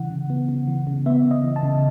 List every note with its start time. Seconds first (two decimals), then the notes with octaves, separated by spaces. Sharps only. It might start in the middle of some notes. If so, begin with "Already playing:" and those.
Already playing: C#3 E3 F#5
0.10 C#3
0.30 B3
0.49 C#3
0.67 E3
0.87 C#3
1.06 B3 E5
1.24 C#3
1.31 D#5
1.44 E3
1.56 A5
1.63 C#3